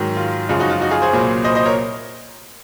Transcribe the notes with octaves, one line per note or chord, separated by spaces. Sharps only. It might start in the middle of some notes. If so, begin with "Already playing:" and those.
Already playing: G#2 D#3 F#3
F4
F#2 C#3 F3 G#3 F4
D#4 F#4
F4
D#4 F#4
F4 G#4
G#4 C5
C2 A#2 F#3
C5 D#5
C5 D#5
A#4 C#5